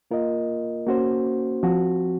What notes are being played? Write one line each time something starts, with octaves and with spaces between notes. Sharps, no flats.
A#3 F4 A#4 D#5
A#3 C#4 F#4 C5
F3 C4 F#4